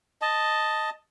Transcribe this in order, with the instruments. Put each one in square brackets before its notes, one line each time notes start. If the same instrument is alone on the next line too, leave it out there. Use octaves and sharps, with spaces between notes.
[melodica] D#5 A5